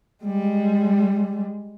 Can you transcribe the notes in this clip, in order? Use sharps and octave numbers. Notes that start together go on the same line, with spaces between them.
G3 G#3